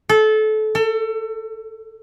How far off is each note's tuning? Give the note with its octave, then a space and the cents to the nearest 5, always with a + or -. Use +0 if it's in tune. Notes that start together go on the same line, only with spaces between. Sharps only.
A4 -25
A4 +30